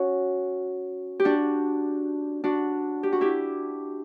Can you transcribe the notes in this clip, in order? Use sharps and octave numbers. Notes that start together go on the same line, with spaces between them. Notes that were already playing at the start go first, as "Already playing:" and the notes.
Already playing: C#4 F#4
G4
D4 F#4
D4 F#4
G4
F#4
E4 G4